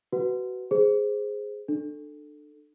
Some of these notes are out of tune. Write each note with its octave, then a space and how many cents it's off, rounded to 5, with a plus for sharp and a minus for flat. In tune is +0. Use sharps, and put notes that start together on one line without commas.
F#4 +25 B4 +5 F#5 -5
G#4 +0 C5 +0
D4 +30 A4 +0